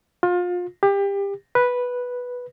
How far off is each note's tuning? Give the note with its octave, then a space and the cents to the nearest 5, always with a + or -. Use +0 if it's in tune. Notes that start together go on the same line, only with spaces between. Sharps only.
F4 +30
G4 +25
B4 -5